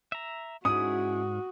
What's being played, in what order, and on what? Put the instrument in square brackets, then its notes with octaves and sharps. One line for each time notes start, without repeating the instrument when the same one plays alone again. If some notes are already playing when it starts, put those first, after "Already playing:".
[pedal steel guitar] E5 A#5
[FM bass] G#2 [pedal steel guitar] C#4 E4 G#4 [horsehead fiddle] F#4 [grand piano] D#6